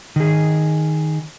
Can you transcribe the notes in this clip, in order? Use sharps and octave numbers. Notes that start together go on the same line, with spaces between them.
D#3 G#4